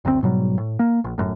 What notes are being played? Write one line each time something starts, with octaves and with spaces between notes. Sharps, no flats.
F#1 D2 A2 C4
G#2 B2 F#3 G3
A2
A#3
A#1
G1 F#2 A2